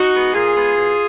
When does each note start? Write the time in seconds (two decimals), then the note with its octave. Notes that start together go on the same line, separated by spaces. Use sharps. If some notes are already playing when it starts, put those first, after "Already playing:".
Already playing: D#4 F#4
0.13 G#3 B3
0.33 A#2 F4 G#4
0.54 G#3 B3
0.76 B2